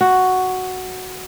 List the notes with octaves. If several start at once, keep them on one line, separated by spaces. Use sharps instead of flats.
F#4